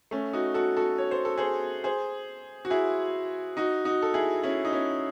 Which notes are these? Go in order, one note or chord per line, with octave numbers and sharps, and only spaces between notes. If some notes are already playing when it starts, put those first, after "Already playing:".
A3 C#4
D#4 F#4
F#4 A4
F#4 A4
C#5
C5
A4
G#4 C5
G#4 C5
F#4
E4 G#4
D#4 F#4
D#4 F#4
A4
E4 G#4
C#4 E4
D#4
C#4 E4